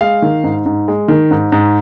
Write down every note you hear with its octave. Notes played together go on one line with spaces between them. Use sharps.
G#3 F5
D#3
G#2
G#2
G#3
D#3
G#2
G#2